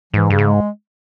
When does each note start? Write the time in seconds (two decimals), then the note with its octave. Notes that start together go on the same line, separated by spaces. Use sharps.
0.13 G#2 E3
0.30 G2 C#3
0.38 G#2
0.47 G#3